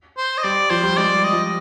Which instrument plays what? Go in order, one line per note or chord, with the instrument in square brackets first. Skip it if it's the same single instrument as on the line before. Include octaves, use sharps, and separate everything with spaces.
[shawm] C5
D#5
[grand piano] G3 [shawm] D5
[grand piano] F3 [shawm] C5
[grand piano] G3
[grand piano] G#3 [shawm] D5
[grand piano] G3
[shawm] D#5
[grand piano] F3